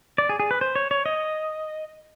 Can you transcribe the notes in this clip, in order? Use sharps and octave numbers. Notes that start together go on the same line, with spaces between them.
D5
G#4
G#4
B4
C5
C#5
C#5
D#5